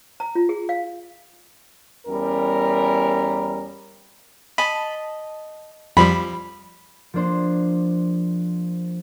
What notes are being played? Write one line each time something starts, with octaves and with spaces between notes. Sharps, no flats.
A#5
F4
G#4
F5
E2 G3 C#4 A#4
D#5 A5 B5
F2 F3 G3 B5
F3 A#3 D4 C5